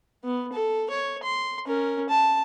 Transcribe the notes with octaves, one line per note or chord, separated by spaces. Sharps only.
B3
A4
C#5
C6
C#4 A#4
A5